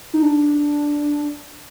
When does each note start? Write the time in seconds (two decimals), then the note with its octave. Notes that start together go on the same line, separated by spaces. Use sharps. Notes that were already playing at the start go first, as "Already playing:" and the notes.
0.14 D#4
0.23 D4